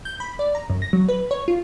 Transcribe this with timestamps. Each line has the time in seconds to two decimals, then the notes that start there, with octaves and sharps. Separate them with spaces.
0.05 G6
0.20 B5
0.39 D5
0.55 A#5
0.70 F#2
0.82 A#6
0.93 F#3
1.09 B4
1.31 C#5
1.48 F4